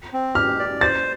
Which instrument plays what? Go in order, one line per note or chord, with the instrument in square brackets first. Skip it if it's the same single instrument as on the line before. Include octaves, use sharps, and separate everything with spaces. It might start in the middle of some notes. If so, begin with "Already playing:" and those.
[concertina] C4
[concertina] G4 [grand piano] F6
[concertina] D5
[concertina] C5 [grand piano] A6